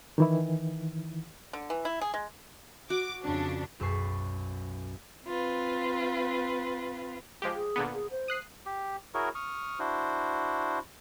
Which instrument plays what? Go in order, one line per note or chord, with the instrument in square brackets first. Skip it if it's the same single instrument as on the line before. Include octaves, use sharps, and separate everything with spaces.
[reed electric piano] D#3 E3 E4
[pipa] D3
E3
E4
G#4
G#3
[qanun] F#4 [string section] D6
[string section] F2 C#3 D4
[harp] B1 F#2 A4 B4 C#6 C7
[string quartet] C4 F4 B4
[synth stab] F3 G#3 G4
[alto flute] G#4
[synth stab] A#2 D3 B3
[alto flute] G#4
C5
[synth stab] D#6 F#6 C7
[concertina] G4
E4 F#4 G#4 A#4 C#5
C#6 D#6 F6
D4 E4 F#4 C5